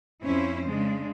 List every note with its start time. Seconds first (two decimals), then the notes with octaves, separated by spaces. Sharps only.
0.23 F2 F3 C#4 E4 C5
0.66 C#3 G#3 D4